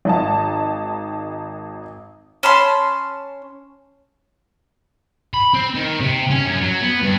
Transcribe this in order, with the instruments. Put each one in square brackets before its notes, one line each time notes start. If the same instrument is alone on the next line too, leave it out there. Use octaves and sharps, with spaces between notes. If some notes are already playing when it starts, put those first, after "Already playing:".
[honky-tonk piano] G#1 D#4 A5
[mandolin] C#4 A5 B5 C6
[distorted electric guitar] B5
C4
D#3
C3
C#4
F#2
F#3
B3
G2